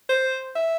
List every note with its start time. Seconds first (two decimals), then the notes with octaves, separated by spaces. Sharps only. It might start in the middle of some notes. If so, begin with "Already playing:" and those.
0.09 C5
0.56 E5